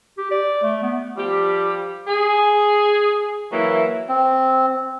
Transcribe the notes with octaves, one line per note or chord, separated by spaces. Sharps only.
G4
D5
A3
B3
F3 G3 G4
G#4
E3 F#3 A#3 E4
C4